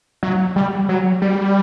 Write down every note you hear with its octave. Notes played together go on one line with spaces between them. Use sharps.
F#3
G3
F#3
G3